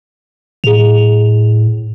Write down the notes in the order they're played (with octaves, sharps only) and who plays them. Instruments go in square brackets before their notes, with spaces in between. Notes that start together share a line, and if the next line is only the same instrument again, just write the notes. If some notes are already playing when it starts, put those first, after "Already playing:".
[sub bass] A2 [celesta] G#4 F7